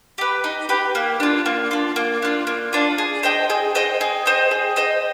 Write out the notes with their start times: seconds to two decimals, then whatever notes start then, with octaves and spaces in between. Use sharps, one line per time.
0.18 G4 B4
0.44 D#4
0.69 G4 B4
0.95 A#3
1.20 D4 F4
1.46 A#3
1.71 D4 F4
1.96 A#3
2.22 D4 F4
2.47 A#3
2.73 D4 F4
2.98 G#4
3.23 C5 D#5 G5
3.50 G#4
3.75 C5 D#5 G5
4.01 G#4
4.26 C5 D#5 G5
4.51 G#4
4.76 C5 D#5 G5